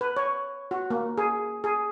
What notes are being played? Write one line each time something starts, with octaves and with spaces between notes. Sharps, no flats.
B4
C#5
F#4
A#3
G#4
G#4